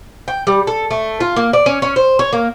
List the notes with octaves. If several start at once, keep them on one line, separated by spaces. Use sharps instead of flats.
G5
G3
A4
A3
F4
A#3
D5
C#4
C#4
C5
C#5
A#3